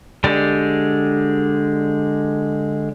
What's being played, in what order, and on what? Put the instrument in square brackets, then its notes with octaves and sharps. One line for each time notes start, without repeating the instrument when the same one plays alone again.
[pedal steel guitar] D3 G#3 G4 D5